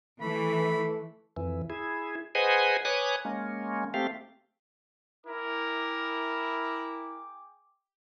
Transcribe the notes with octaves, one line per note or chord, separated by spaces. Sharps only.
E3 A3 B5
F2 E3
E4 G#4
G#4 B4 C5 D#5 F#5 G#5
B4 C#5 G#5 D6 D#6 F#6
G#3 A#3 C#4
A3 C4 G4 F5
E4 G#4 A#4 G5 D6